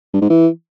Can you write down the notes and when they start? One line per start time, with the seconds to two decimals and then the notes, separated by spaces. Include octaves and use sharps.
0.13 G2
0.22 G#2
0.30 E3